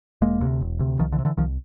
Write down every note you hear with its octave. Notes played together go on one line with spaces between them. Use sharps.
E1 G#3 A#3
D2 C3
E1
D2 C3
C2 D#3 F3
D3 E3
C3
D3 E3
C2 D#3 F3